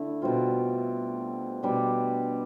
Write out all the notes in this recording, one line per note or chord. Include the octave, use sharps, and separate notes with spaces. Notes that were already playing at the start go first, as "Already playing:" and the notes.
Already playing: D3 A3 E4
B2 G3 C4 F4
B2 G3 D4